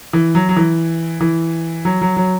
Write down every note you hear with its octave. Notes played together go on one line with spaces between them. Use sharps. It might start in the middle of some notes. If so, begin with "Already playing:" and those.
E3
F#3
F#3
E3
E3
F#3
F#3
F#3